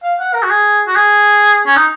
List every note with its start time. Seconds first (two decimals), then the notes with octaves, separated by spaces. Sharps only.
0.04 F5
0.20 F#5
0.34 A#4
0.43 F#4
0.50 G#4
0.87 F#4
0.95 G#4
1.66 C#4
1.76 D#4